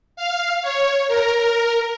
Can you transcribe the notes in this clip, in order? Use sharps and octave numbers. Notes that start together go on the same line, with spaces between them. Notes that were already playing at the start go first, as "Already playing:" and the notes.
F5
C#5
A#4